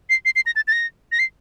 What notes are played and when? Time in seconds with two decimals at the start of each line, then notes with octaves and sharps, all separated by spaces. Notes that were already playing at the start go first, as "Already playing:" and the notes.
0.10 C7
0.25 C7
0.36 C7
0.46 A#6
0.56 A6
0.68 A6
0.72 A#6
1.12 A#6
1.19 C7